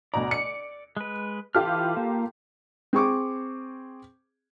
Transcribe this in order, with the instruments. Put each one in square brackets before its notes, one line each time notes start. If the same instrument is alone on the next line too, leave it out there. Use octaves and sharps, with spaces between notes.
[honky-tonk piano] D2 B2 A#5 [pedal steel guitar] D5
[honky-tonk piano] C#7
[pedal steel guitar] G#3 B4
[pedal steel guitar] E3 F6 [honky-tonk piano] F4 G4 A4
[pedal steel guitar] A#3
[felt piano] C4 G#4 C#6 D6